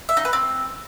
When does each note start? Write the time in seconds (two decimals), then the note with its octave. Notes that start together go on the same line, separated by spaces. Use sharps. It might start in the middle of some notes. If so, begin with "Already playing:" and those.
0.09 E5
0.17 D#4
0.25 B4
0.33 C4